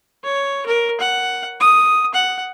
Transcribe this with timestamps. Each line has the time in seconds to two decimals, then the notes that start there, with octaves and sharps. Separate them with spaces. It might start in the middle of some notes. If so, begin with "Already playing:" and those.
0.24 C#5
0.66 A#4
1.00 F#5
1.60 D#6
2.14 F#5